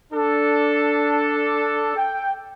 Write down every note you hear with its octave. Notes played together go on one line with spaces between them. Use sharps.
D4 A4
G5